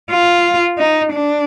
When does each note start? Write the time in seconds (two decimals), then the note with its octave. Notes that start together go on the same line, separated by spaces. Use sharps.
0.10 F4
0.78 D#4
1.12 D4